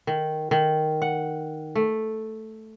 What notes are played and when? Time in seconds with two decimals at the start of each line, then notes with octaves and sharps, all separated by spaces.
0.07 D#3
0.51 D#3
1.02 F#5
1.75 A3